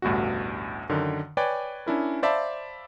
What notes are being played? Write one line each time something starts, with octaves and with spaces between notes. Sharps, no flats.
A1 D2 G2 B2 F#4
F#2 D3 D#3
B4 C#5 D5 G5 G#5
C#4 D4 E4 A#4
C5 D5 E5 F5 A5 B5